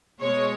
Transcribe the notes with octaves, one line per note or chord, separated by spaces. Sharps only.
B2 G#3 C#5